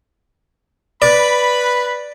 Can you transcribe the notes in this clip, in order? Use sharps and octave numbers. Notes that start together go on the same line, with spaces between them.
B4 D5 B5